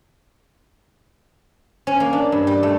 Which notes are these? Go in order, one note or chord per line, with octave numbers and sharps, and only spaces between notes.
C#4
A#3
D4
G2
G3
A3